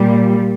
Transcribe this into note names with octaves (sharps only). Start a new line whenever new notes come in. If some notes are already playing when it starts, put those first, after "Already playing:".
Already playing: A#2 G3